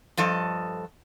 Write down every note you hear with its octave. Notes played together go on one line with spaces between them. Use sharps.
G2 F3 A4 D#5